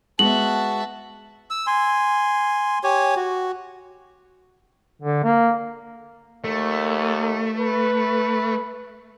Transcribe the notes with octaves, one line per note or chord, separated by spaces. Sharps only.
G#3 B3 F#4 E5 F#5 A5 F#7
E6
G#5 C6
G4 C#5 G#5
F#4
D3
A#3
D#2 A3
B4